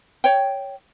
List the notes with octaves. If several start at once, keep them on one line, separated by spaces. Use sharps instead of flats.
C#5 G5